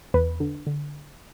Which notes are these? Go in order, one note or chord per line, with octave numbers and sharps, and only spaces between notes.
E2 B4
D3
D3